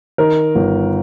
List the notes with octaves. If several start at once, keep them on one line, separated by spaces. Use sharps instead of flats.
D#3 A#4
G1